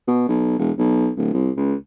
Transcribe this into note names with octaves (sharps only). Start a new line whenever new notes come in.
B2
B1
E1
B1
D1
C2
C#2